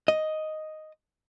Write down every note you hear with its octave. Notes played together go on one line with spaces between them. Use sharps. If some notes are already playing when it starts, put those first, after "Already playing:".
D#5